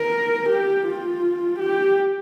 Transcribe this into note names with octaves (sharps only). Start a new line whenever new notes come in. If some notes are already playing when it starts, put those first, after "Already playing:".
Already playing: A#4
G4
F4
G4